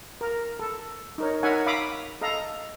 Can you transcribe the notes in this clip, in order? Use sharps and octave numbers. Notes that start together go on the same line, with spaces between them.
A#4
A4
D#4 A#4 C#5
D#4 A#4 C#5 E5 F#5 G#5
E5 F5 B5 D6 D#6
A4 D#5 F5 A#5